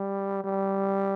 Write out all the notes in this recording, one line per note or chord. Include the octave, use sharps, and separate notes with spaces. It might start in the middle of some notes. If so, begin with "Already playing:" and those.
Already playing: G3
G3